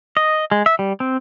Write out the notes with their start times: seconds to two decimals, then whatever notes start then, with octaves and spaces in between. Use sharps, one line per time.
0.17 D#5
0.52 G#3
0.66 E5
0.79 G3
1.00 C4